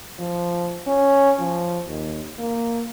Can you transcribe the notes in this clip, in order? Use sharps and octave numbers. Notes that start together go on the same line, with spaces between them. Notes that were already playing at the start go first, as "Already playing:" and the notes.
F3
C#4
F3
D#2
A#3